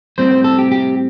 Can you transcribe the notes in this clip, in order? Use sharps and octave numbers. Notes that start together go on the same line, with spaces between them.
A2 G3 C4 C5
C5
A4
G4
G4